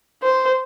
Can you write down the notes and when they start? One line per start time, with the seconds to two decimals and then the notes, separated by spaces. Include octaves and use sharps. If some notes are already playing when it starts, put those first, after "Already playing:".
0.23 C5